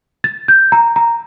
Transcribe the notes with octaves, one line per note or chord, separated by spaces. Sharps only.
A6
G6
A#5
A#5